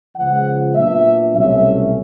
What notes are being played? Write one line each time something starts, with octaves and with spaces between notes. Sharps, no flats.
C#2 C#3 F3 F#5
A#2 F#3 B3 D4 E5
C2 B2 F#3 A3 C#4 E5